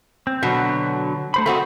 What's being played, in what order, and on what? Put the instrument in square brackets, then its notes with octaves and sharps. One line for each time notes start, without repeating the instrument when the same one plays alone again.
[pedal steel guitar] C4
[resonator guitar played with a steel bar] B2 [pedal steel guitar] D3 F#3
[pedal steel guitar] A3 C5 B5
[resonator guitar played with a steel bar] A3 C4 F#4 [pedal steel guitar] D#5 B5